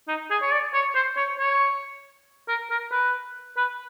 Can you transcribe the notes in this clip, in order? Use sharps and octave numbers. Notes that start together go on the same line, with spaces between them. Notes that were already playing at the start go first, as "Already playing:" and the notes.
D#4
G#4
C#5
D5
C#5
C5
C#5
C#5
A#4
A#4
B4
B4